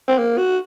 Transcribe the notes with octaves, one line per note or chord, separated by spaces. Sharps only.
C4
A#3
F#4